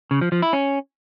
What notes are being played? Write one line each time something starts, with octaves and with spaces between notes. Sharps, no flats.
C#3
F3
F3
E4
C#4